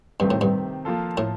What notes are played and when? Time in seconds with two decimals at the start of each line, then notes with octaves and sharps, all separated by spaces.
0.20 G2 C3 D#3 A3 C4 G4
0.30 A2
0.41 G2
0.85 F3 A#3 F4 A4
1.17 A2